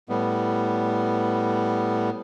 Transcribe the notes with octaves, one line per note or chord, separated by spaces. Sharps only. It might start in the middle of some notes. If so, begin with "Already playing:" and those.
A2 G3 B3